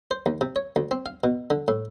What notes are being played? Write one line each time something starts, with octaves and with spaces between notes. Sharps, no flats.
C5
D#2
C3
C#5
D2
C4
F5
B2
D3
A2